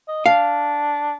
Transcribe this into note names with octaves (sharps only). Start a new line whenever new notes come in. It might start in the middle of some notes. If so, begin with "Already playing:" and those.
D#5
D4 F5